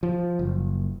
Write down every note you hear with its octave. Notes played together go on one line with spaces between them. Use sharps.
F3
F#1